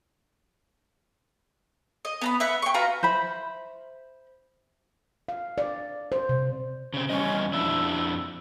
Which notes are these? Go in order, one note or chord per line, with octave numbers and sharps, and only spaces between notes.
D#5
B3 A#5 B5
B4 E5 F#5
G5 C#6
F4 F#4 B4 A#5
C5 E5 B5
F5
D5
C5
C3
C#3 C4
E2 G3 C#4 D#5
F2 D4 E4 E6